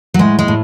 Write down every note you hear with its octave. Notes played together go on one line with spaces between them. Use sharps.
F#3
A2 G#3
G#3
A2